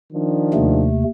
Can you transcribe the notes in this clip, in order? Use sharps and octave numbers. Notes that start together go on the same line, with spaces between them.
D#3 F3 D4
D#2 C3 A3